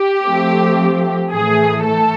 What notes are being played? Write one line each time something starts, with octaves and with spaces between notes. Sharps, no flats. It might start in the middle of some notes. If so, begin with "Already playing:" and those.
Already playing: G4
F3 A3 C4
A2 E3 A3 G#4
A4